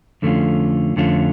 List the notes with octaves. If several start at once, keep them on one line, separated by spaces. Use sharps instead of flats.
F2 D3 A3 C#4 F4
F2 D3 A3 C#4 F4